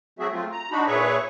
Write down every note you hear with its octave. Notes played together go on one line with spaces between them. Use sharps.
F#3 A3 C4 F#4 G#4 E5
A3 C4 F4
A#5
D4 D#4 F#4 B5
A#2 G#4 B4 C#5 E5 C#6